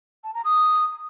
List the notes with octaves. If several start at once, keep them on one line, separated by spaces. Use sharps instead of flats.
A5
A#5
D#6